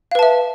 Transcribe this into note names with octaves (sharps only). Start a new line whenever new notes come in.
B4 E5 F5 A5